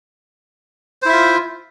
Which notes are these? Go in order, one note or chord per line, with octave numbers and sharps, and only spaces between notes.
E4 F4 C5 E5